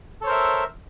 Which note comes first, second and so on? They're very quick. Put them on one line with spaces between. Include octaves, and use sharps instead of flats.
A4 C#5 C5 A#4 E5